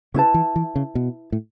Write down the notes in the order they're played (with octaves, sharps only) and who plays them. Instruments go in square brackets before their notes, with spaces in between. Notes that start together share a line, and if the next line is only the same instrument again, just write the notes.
[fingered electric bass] C#3 [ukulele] C#4 E4 B4 A5
[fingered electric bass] E3
E3
C#3
B2
A2